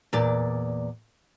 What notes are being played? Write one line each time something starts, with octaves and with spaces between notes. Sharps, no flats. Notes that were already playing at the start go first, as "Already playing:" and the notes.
E2 A#2 D5